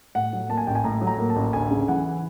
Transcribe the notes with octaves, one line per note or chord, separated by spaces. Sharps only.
A2 F#5
F#3
A#3 A5
G#5
A1 G5
G#5
A2 A#5
F#3
A#5
A#3
A5
A1
D2 G#5
C#3
E3 F#5